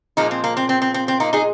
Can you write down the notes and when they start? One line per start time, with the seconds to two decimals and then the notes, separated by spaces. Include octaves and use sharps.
0.17 A#2 F3 G#3 A#3 D#4
0.31 C4
0.44 A#3
0.57 C4
0.69 C4
0.82 C4
0.94 C4
1.08 C4
1.20 A#3 D#4
1.33 D#4 G#4